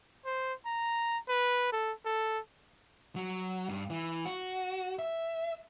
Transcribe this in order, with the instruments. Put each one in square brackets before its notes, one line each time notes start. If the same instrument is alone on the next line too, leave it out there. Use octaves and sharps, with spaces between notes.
[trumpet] C5
A#5
B4
A4
A4
[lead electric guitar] F#3
G2
E3
F#4
E5